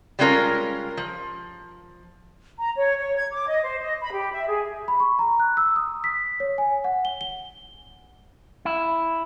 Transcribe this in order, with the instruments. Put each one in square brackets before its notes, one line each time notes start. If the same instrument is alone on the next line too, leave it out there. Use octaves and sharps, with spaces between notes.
[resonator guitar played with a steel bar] G3 G#3 C#4 F4 A#4
F3
[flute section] A#5
C#5
C#5
G#6
D6
D#5
C5
D#5
B5
G4
E5
G#4
[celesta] B5
C#6
A#5
F#6
E6
D#6
B6
C#5
G#5
F#5
G7
G7
[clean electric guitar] E4